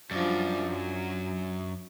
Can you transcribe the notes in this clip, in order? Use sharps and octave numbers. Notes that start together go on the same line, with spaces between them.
F#2 F3 G3 D4
F#3